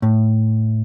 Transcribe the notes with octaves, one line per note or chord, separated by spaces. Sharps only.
A2